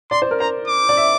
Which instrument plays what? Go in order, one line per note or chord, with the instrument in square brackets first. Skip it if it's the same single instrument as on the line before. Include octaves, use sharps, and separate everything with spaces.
[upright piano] D5 [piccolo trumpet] C6
[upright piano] C5
A#4
[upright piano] C5 [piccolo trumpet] A#5
[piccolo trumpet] D6
[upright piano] D5
E5